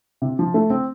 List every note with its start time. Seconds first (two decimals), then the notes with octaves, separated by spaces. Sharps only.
0.22 C3
0.39 F3
0.54 A3
0.70 C4